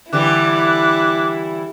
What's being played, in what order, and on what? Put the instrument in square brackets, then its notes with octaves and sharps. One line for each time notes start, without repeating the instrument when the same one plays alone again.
[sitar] D3 E3 G3 [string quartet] E4 [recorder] D6 [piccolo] F#6